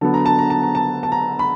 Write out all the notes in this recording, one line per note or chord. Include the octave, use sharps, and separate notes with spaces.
D3 F#3 B3 A5
A#5
A5
A#5
A5
A#5
A5
A5
A#5
B5